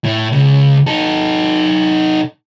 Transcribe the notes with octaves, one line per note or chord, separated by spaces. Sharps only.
A2
C#2 C#3
D#4 A4